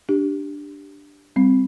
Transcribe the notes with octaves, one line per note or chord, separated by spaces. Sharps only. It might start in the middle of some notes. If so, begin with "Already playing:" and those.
D4 G4
G3 C4